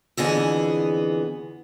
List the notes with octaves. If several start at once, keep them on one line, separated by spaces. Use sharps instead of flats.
F2 D3 E3 B3 G#4